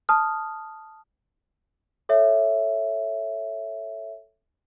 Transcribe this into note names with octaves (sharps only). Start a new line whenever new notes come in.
A5 D#6 F6
A4 C#5 E5